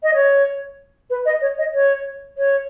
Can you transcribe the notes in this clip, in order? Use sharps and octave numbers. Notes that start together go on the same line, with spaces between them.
D#5
C#5
B4
D#5
C#5
D#5
C#5
C#5